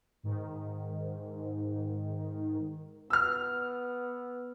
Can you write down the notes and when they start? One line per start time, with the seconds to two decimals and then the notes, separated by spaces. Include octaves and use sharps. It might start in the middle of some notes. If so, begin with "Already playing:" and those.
0.23 G#2 D#3
3.10 B3 E6 F6